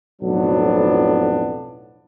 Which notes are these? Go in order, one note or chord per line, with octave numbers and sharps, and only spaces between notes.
B1 F2 A2 F#3 B3 D4